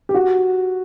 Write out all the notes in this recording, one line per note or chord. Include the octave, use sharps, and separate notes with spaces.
G4
F#4